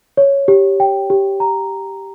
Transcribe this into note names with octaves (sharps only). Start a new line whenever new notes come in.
C#5
G4
G5
G4
A#5